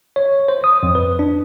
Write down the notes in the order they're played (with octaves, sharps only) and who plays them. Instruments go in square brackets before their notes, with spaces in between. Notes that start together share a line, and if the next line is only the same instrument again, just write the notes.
[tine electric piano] C#5
C5
D#6
F2
B4
D4